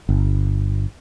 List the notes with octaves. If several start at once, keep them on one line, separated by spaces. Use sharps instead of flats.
G1